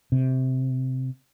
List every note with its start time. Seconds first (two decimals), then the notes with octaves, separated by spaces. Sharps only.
0.12 C3